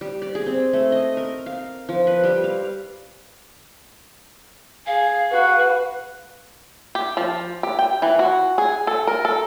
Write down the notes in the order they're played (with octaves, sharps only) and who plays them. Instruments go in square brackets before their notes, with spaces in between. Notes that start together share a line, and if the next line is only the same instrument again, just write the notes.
[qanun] G3
D5
G#4
C4
A3
D#5
A#4
F5
F3
B4
G3
F5
[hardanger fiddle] G#4 [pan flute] F5
[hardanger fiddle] F#4 [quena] B4
[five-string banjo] G4
F3
G4
G5
E3
F#4
G#4
A4
A#4
A4